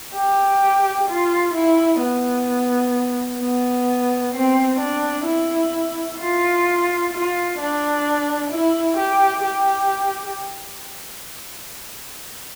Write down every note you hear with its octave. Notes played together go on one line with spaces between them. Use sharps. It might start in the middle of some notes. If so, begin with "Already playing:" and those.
G4
F4
E4
B3
B3
C4
D4
E4
F4
F4
D4
E4
G4
G4